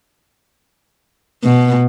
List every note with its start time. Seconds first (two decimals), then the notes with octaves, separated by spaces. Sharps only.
1.44 B2